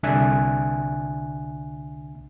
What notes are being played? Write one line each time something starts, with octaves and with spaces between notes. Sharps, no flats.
C2 D3 D4 E5 G#5 F#6